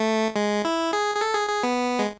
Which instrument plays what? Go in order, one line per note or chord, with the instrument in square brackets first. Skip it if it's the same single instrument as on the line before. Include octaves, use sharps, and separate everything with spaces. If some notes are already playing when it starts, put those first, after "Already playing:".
Already playing: [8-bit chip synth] A3
G#3
E4
G#4
G#4
A4
G#4
G#4
B3
G#3